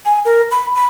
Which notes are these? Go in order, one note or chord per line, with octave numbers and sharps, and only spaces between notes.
G#5
A#4
B5
B5